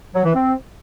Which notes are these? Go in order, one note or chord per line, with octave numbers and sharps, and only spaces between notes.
F#3
E3
C4